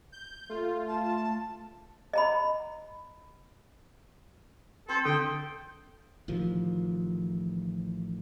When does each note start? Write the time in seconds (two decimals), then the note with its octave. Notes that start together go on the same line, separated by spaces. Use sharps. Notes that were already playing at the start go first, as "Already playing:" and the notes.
0.12 G6
0.49 A3 F4
0.88 A5
2.13 D#5 A#5 B5
4.89 C4 A4 C5
5.05 D3 A4 G5 D#6
6.28 A1 D#3 F3